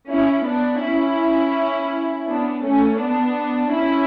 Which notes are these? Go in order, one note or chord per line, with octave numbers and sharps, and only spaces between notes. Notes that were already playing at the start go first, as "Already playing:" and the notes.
C#4 E4
B3 D4
C#4 E4
B3 D4
A3 C#4
B3 D4
C#4 E4